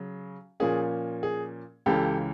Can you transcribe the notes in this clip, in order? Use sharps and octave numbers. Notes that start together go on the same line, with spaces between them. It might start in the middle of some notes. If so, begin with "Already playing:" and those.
Already playing: C#3 F#3
A#2 F3 A#3 C#4 G#4
G#4
C#2 C#3 E3 G4 A4